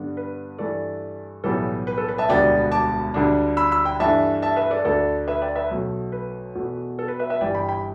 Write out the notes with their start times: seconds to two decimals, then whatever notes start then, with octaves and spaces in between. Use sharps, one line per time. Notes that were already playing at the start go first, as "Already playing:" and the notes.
Already playing: G2 D3 B3 D4
0.17 B4
0.58 G2 E3 A3 A4 D5
1.44 B1 A2 E3 G3 B3 A4
1.87 B4
1.98 A4
2.09 B4
2.18 E5 A5
2.29 E1 D2 D3 G3 B3 D5 G5
2.72 A5 D6
3.14 D2 D3 G3 D4
3.57 B5 E6
3.72 B5 E6
3.85 G5 B5
4.00 G2 E3 A3 D4 E5 A5
4.42 E5 A5
4.56 B4 E5
4.71 A4 D5
4.85 D2 D3 A3 A4 D5
5.28 B4 E5
5.42 D5 G5
5.55 B4 E5
5.71 B1 B2 A3
6.12 B4
6.55 E2 B2 A3
6.99 A4
7.08 B4
7.19 B4 E5
7.30 B4 E5
7.41 G1 G2 E3 G3 D5 G5
7.55 G5 B5
7.69 G5 B5